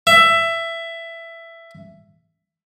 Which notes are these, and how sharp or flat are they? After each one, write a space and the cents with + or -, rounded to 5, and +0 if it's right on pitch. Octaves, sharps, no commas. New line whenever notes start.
E5 +15